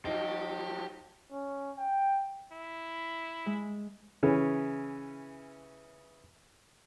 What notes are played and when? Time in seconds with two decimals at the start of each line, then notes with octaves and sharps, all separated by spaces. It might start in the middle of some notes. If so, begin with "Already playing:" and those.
0.05 F3 F#3 D#4 G4
1.31 C#4
1.78 G5
2.53 E4
3.46 G#3
4.23 C#3 E3 C#4